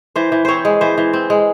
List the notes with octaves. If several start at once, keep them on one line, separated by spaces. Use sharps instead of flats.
E3 C5
E3
C4 C5 C#5
G#3
E3 C5
E3
C4
G#3